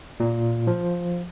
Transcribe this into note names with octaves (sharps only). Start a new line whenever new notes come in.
A#2
F3